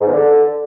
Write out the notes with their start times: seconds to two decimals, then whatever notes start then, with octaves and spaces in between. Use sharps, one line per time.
0.01 G#2
0.07 E2
0.12 D3